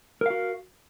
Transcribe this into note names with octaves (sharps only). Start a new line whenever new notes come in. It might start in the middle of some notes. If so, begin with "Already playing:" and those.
F#4 A#4 F5